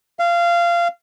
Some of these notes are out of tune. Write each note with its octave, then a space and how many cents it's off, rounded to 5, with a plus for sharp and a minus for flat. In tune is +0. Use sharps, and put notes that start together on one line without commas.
F5 -20